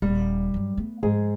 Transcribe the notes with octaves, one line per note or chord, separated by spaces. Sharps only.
D#1 G3
G2 F#3
A3 B3
G#2 F3 G#4